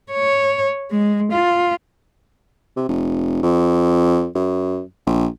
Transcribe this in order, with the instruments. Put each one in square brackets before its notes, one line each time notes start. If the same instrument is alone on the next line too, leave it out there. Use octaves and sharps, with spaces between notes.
[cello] C#5
G#3
F4
[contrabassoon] C3
F1
F2
F#2
A#1